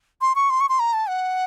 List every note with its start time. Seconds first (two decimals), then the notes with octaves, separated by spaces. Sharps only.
0.21 C6
0.36 C#6
0.50 C6
0.61 C#6
0.69 C6
0.79 A#5
0.93 A5
1.09 F#5